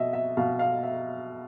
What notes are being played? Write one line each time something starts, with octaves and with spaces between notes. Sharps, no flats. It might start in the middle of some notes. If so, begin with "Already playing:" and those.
Already playing: B2 D#5 E5
E5
B2 F5
F5
E5